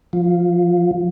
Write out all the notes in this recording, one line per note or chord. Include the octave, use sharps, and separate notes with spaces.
F3